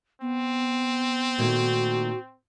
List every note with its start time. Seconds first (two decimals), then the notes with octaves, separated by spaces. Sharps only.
0.21 B3 C4
1.39 A#2 D#3 A3 F#4